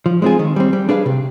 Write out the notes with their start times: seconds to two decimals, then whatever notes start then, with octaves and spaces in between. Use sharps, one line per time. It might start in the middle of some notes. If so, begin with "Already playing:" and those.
0.06 F3
0.22 G#3 C4 F4 G#4
0.39 D#3
0.56 G3 C4
0.73 G3
0.89 D4 G#4 B4 F5
1.06 C3